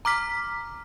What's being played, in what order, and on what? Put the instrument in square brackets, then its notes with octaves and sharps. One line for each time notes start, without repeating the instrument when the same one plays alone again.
[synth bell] A#5 D6 F6 B6